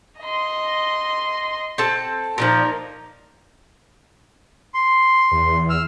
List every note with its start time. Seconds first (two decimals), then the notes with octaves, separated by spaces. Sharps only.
0.20 D#5 C6
1.78 C4 A4 A5
2.38 A#2 D#3 F3 D#4 A#4
4.74 C6
5.31 E2
5.70 E6 F6